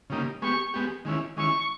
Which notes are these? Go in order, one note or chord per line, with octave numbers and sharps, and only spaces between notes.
C#3 G3 A#3 D#4
G#3 B3 G4 C#6
G#3 B3 G4
D#3 G#3 C#4 E4
D#3 G#3 C#4 E4 C#6